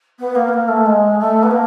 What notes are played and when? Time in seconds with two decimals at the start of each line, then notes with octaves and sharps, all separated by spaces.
0.19 B3
0.35 A#3
0.48 B3
0.53 A#3
0.68 A3
0.86 G#3
1.19 A3
1.43 B3
1.50 A#3